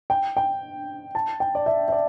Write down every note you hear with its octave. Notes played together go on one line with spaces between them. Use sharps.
G5
G5
A5
G5
D5
E5
E5
D5